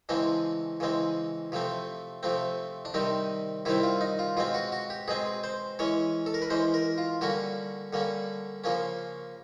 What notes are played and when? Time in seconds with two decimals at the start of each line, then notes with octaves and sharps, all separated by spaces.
0.09 C#3 E3 G#3 C4 D4
0.80 C#3 E3 G#3 C4
1.52 C3 F3 A3 C4
2.23 C3 F3 A3 C4
2.85 D4
2.94 C3 D#3 G3 C4 D#4
3.65 C3 D#3 G3 C4 E4
3.83 F4
4.01 D#4
4.19 F4
4.37 B2 G#3 C4 F4
4.54 F#4
4.72 F#4
4.90 G4
5.08 B2 G#3 C4 G#4
5.44 C5
5.79 E3 G#3 C#4 C#5
6.26 A4
6.34 A#4
6.42 B4
6.50 E3 G#3 C#4 C5
6.74 A#4
6.98 F4
7.21 D3 G3 A#3 C#4 F#4
7.93 D3 G3 A#3 C#4
8.64 C#3 F3 A#3 C#4